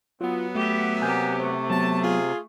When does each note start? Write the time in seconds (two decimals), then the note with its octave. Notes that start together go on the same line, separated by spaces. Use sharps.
0.21 F#3 B3 F4
0.55 A3 G4 E5
1.02 C3 A#3 G4 G#5 G6
1.40 A3 C5
1.70 F#3 B3 A5
2.02 F4 G#4